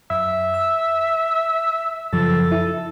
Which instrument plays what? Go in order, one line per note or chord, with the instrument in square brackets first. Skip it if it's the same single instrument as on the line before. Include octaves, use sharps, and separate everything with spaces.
[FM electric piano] F#2 [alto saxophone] E5
[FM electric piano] E6
[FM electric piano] F#2 C#3 F3 [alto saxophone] A4
[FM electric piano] E4